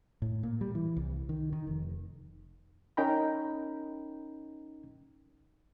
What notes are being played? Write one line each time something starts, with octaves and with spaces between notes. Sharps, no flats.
A2
A#2
G3
E3
C2
D#3
D#3
F1
C#4 D#4 A#4 G5 A#5 B5